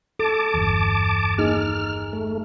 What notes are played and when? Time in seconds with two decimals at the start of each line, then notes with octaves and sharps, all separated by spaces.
0.19 A4 A5 D6
0.54 G1 E2
1.38 A#3 D#4 G#4 F6
2.13 A3